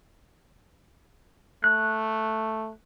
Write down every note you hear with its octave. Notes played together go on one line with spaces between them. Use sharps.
A3 F#6